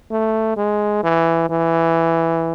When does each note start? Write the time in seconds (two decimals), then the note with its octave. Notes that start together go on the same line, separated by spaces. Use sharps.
0.11 A3
0.57 G#3
1.03 E3
1.49 E3